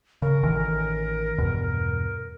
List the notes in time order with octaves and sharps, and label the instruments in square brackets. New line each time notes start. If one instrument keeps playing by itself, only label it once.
[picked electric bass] C#3 [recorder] A#4
[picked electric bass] A1 D#3 E3
E2 G2 B2